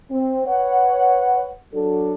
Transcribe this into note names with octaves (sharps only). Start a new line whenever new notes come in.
C4
B4 C#5 F#5
F#3 D4 A4